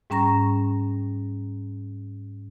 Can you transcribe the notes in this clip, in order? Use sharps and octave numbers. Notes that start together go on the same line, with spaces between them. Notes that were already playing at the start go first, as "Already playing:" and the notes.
G#2 G3 C#4 A#5 C#6 A#6